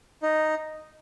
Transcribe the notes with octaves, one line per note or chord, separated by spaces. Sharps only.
D#4